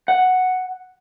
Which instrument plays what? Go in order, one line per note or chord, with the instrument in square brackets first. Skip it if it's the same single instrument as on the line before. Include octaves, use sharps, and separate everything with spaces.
[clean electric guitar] F#5